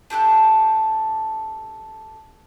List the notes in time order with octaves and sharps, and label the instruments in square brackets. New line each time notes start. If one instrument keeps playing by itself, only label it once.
[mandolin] D4 G4 A4 F#6